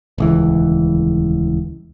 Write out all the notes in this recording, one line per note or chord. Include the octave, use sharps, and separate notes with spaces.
D#1 C#2 E3